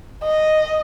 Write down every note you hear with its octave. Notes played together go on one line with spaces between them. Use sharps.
D#5